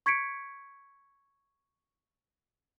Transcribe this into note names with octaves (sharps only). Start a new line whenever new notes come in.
C#6 G#6 B6 C#7 D7